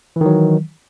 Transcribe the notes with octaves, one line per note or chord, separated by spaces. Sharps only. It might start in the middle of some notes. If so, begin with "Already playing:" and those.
D#3 E3 F#3